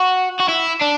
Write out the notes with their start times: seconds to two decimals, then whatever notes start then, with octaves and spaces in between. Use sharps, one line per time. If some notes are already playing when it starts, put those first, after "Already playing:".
Already playing: F#4
0.40 F#4
0.48 E4
0.81 D4